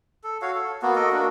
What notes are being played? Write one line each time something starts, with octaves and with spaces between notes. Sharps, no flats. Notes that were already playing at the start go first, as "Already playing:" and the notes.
A4
F#4 C#5 F5
A4
A#3 B3 F#4
F#4 A4 A#4 D#5
A#3 D4 F#4